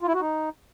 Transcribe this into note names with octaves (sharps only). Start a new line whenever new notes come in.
F4
E4
F#4
D#4